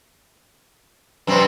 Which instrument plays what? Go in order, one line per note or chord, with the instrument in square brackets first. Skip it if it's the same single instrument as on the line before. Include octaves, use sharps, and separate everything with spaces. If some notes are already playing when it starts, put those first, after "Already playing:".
[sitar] F#2 C3 C4 [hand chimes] B4 C5 B5